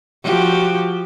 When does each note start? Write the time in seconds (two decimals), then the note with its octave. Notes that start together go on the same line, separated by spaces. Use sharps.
0.23 F3 F#4 G4